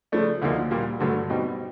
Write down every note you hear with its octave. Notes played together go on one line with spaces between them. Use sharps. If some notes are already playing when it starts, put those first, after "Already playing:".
C#3 F3 A3 D4
D2 D3 F3 A#3 D#4
A#2 G3 A#3
G2 D3 F#3 A3
B2 G3 C4 D#4